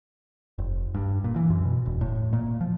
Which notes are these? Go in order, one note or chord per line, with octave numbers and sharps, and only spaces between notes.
F1
G2
A#2
E3
F#2
B2
E1
A2
A#2
F3